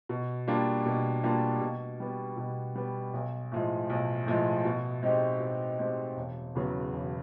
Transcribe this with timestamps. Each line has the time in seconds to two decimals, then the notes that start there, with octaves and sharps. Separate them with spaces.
0.09 B2
0.47 G3 A#3 D4 F4
0.86 B2
1.23 G3 A#3 D4 F4
1.61 B2
2.00 G3 B3
2.37 B2
2.76 G3 B3
3.13 B1
3.52 A2 F3 G#3
3.90 B1
4.27 A2 F3 G#3
4.65 B2
5.03 G#3 C4 D#4 G4
5.40 B2
5.79 G#3 C4 D#4 G4
6.16 E1
6.55 E2 C#3 F#3 B3
6.92 E1